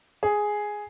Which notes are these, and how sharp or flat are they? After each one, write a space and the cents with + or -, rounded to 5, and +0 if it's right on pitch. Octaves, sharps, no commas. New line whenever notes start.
G#4 +0